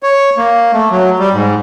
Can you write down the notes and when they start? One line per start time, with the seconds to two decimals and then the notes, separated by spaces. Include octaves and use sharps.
0.03 C#5
0.38 A#3
0.73 A3
0.91 F#3
1.19 G3
1.33 G#2